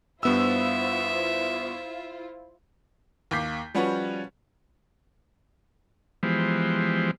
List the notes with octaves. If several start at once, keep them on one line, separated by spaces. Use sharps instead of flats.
G2 B3 E4 F4 C5 E5 E6
D#2 A#3 D6 G6 B6 C7
F3 G3 C#4 F#4 B4 C#5
E3 F3 G#3 B3 G4 C5